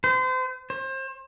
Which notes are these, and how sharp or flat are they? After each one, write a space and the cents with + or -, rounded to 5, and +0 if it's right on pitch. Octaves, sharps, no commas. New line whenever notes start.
C5 -35
C5 +30